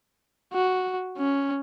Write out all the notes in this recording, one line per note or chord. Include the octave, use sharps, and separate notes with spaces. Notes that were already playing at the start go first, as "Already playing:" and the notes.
F#4
C#4